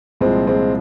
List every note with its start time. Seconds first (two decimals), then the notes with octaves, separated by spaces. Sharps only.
0.21 C2 A#2 F3 G#3 C4
0.47 G#3 C4